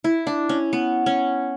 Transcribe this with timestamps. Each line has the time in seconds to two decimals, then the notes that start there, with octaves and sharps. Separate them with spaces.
0.04 E4
0.27 D4
0.49 C#4
0.73 B3
1.06 C#4